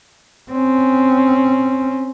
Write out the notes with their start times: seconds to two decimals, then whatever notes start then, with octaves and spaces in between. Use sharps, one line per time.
0.51 C4 C#4